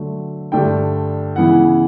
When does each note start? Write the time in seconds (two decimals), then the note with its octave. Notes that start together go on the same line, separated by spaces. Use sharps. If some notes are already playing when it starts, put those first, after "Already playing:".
Already playing: D3 F#3 A3
0.52 G2 D3 A3 D4 G5
1.36 C#3 E3 B3 E4 F#5